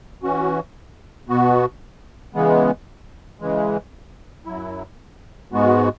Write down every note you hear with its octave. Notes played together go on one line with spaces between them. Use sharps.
E3 C#4 F#4
B2 B3 F#4
C#3 E3 G#3 B3
C#3 E3 G#3
F#2 F#3 E4
G#2 G#3 B3 F#4